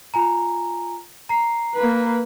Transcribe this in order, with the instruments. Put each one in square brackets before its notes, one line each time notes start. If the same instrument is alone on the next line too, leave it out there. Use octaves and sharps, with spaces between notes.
[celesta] F4 G#5 A#5
A#5 C7
[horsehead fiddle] A#3 B4